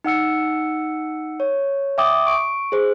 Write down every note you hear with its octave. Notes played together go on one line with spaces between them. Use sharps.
D#4 F#5 E6 C#7
C#5
E5 G5 D6 D#6
C#6 D7
G#4 C5